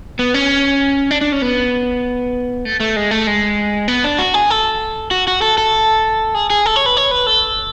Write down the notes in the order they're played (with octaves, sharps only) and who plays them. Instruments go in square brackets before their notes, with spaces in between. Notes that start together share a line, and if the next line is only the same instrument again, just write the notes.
[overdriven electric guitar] B3
C#4
D4
D4
C#4
B3
A3
A3
G#3
A3
G#3
B3
D4
F#4
G#4
A4
F#4
F#4
A4
A4
G#4
G#4
A4
C#5
B4
C#5
B4
A4